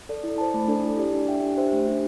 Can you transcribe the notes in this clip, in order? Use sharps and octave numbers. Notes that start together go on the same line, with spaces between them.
A4 D5
E4
C5 A5
A3
D4 A4 D5
E4
G4 D5
D4
G4 E5 G5
D4
G4 C5 E5
A3
D4 G4